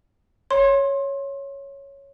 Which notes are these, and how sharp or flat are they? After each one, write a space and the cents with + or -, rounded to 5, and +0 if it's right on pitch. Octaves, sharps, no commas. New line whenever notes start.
C#5 +0 C6 +25